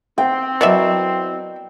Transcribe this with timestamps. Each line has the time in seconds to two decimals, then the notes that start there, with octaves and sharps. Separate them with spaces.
0.18 C4 G5
0.61 B2 F#3 E4 A#4 D5 E5